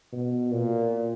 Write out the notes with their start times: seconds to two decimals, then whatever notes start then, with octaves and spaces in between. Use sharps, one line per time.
0.13 B2
0.52 A#2